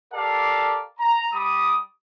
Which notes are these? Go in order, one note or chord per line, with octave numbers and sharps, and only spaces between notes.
G4 A4 A#4 D5 F5 A5
A#5
G3 B5 D6 D#6